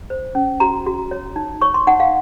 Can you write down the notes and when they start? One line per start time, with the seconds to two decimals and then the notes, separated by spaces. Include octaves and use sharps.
0.10 C5
0.35 C#4
0.60 F#4 A#5
0.86 F#4
1.11 C#5
1.36 D#4
1.61 C#5 C#6
1.74 C6
1.87 D#4 F#5
2.00 F5